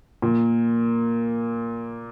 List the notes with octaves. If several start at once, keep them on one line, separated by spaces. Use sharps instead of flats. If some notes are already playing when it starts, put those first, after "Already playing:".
A#2